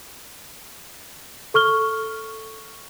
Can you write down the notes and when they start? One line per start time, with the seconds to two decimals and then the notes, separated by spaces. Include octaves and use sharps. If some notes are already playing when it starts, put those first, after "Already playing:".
1.54 A4 C#6 F6 G7